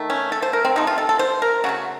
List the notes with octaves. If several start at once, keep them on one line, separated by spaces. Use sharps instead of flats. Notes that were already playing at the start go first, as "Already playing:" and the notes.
Already playing: D#3 A3
C#4
A4
C5
A#4
C4
C3 F3 A3 D#4
F4
A4
A4
C5
A#4
C#3 F#3 A3 F#4